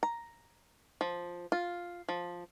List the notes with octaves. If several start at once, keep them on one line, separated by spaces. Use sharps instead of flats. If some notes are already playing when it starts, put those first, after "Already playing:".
A#5
F3
F4
F3